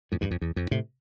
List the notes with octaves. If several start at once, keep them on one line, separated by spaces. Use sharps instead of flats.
F2 A2
E2 G2
F2
E2
F2
A2 C3